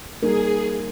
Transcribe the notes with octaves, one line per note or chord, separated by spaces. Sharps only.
G3 A#3 D#4 G#4 A#4